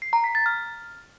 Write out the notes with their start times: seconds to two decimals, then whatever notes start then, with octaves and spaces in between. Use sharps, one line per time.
0.02 C7
0.13 A#5
0.24 B6
0.35 A6
0.46 F6